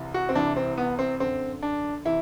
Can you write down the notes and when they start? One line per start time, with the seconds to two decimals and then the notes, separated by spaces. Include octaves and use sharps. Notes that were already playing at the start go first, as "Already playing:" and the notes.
Already playing: C2 C3 E3
0.14 F#4
0.29 C4
0.35 C2 C3 E3 D4
0.57 C4
0.77 B3
0.99 C4
1.20 F#2 D3 C4
1.63 D4
2.05 C3 E3 E4